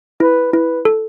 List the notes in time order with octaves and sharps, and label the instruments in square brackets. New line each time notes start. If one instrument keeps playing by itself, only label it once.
[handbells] E4 [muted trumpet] B4
[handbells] E4 [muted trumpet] B4
[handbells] A4